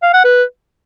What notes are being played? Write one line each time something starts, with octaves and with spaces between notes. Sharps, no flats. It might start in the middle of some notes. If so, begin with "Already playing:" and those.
F5
F#5
B4